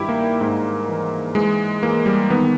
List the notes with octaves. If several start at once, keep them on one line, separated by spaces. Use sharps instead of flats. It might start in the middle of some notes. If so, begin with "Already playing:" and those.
Already playing: G2 D#3 E4 G4
A#3
G#2
E3
E3 G#3
E3 A#3
G3
D#3 B3